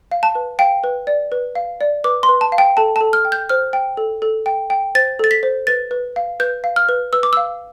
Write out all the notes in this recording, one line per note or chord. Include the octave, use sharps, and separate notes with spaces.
F5
A5
B4
F5 G5
B4
D5
B4
F5
D5
B4 D6
C6
B4
A5
F5
G5
A4 A5
A4 A5
F6
G5
G6
C5 F6
G5
A4
A4
G5
G5
C5 A6
A4 A6
B6
C5
B4 A6
B4
F5
B4 G6
F5
F6
B4
B4 E6
D6
F5 E6